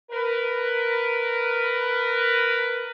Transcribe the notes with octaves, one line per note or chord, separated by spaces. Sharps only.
A#4 B4